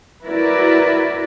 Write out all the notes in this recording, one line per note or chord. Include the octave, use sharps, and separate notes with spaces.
E4 F#4 A#4 B4 D5